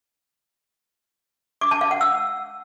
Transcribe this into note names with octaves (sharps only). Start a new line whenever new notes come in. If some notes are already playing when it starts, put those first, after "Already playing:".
D6
A5
F5
F#5
E6